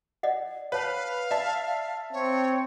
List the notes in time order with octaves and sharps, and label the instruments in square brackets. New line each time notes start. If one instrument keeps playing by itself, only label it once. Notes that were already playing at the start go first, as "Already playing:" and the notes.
[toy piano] D5 D#5 F#5
[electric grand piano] B4 [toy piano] C#5 A5 [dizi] F5
[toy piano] D5 [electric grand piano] E5 A5
[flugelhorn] C4 [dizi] C#5